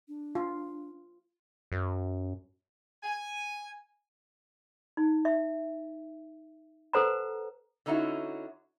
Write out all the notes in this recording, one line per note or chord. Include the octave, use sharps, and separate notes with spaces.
D4
F4
F#2
G#5
D#4
E5
A4 B4 C5 F#5 A5 A#5
D3 C#4 D#4 E4 F#4